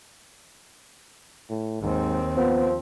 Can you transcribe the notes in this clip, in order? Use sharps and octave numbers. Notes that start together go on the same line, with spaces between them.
A2
D#2 G#2 C4
F3 B3